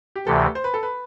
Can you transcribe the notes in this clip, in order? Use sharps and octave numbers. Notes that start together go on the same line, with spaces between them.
G4
D2 C3 E3 A4
C5
B4
A4
B4